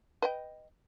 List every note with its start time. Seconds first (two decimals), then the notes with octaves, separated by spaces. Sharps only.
0.22 B4 D#5 G5